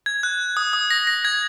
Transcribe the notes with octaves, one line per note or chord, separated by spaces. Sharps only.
G#6
F#6
D#6
D#6
A#6
A#6
G#6